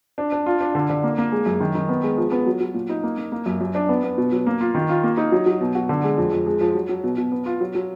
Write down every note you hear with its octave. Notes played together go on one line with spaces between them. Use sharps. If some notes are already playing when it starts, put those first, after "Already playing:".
D4
D4
F4
D4
D3
D3
A#3
A#3
G#3
F#2
D#3
D#3
B3
G#3
F3
B3
F#3
F#3
A#2
D#4
A#3
A#3
A#3
F#2
F#2
D4
B3
B3
B2
F#3
A#3
F4
D#3
F4
A#3
D#4
F#3
F#3
B2
F#4
D3
G#3
F2
F2
G#3
F3
F#3
F#3
B2
B2
B3
F4
F#3
F#3